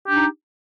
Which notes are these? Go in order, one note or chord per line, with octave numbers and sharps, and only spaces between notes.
D4 D#4 G4